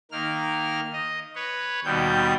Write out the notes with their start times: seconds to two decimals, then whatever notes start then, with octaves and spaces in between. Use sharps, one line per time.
0.12 D#3 A#3 F6
0.93 D#5
1.35 B4 C#5
1.85 D#2 B2 G3 G6